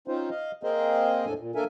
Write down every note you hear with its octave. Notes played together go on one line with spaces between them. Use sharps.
C4 C#4 D#4 F4 C5
D#5 F5
A#3 C4 G#4 A#4 C5 D#5
E2 A2 D4 A4 G#5
A#2
A#3 D4 A4 A#4 E5 G#5